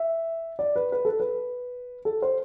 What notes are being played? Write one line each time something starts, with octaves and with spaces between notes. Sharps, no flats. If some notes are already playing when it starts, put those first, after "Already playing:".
Already playing: E5
D5
B4
B4
A4
B4
A4
C5